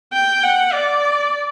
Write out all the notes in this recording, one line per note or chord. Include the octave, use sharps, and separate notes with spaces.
G5
F#5
D5